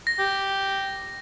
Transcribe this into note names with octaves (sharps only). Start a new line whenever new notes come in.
A#6
G4